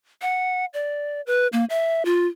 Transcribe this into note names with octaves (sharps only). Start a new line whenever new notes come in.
F#5
D5
B4
A#3
E5
F4